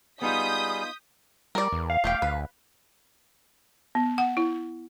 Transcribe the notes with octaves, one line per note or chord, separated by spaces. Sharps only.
G3 B3 D#4 F4 G#4 D#6 G6 B6
G3 A#4 D5
E2
F5
E1 A3 G4 G5
D2 B4
B3
F#5
E4